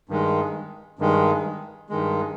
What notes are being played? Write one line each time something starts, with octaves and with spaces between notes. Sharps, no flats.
G2 D#3 G#3
G2 D#3 G#3
G2 D#3 G#3